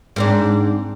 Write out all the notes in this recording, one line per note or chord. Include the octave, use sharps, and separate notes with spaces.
G#2 C4 D4